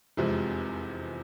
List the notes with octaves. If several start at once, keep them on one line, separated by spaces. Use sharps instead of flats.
F1 E2 C3 F3 G#3